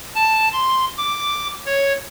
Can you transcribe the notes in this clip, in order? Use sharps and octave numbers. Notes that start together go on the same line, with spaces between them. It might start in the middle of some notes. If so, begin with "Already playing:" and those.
A5
C6
D6
C#5